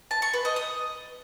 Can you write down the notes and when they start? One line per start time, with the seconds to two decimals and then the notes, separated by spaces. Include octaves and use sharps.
0.11 A5
0.22 C#6
0.33 B4
0.45 D#5
0.56 D#6